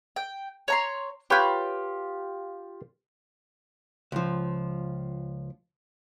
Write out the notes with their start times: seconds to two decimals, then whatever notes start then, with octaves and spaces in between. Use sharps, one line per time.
0.16 G5
0.68 C#5 A#5 C6
1.30 F4 G4 B4 C#5 G5
4.12 C#2 F3